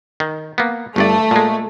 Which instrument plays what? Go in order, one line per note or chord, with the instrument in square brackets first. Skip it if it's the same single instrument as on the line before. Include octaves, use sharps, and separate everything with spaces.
[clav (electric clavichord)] D#3
A#3 B3
[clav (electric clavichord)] G1 G2 D5 [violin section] A3
[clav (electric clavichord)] A#2 G#3